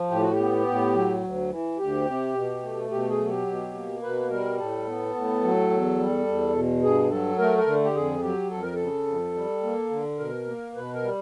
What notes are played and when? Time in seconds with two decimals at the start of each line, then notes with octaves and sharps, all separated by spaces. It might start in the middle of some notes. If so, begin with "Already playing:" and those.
Already playing: F3
0.10 A2 G4
0.22 F#4
0.32 G4
0.39 B3
0.67 A2
0.94 F#3
1.23 D2
1.50 E3
1.78 D2 G4
2.06 C3
2.34 B2
2.62 A3
2.91 B2 G4
3.10 G#4
3.18 F#3
3.28 G4
3.47 B2
3.74 A#3
4.02 B2 B4
4.30 G3 A#4
4.58 A2 A4
4.87 B3
5.15 A2
5.43 F#3
5.71 E2
5.98 G3
6.27 E2
6.55 B2
6.83 G2 G#4
7.10 F#3 A4
7.38 A3 A#4
7.58 A#4
7.66 D3
7.84 G4
7.95 F2 G#4
8.22 F#3 G4
8.51 F2 A4
8.62 A#4
8.74 C#3 A4
9.06 F2
9.34 G3
9.63 A#3
9.91 D3
10.19 B2 A#4
10.46 A#3
10.75 B2 B4
10.93 A#4
11.03 G3